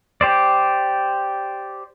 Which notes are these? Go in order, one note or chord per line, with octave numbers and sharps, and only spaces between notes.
G4 C5 D5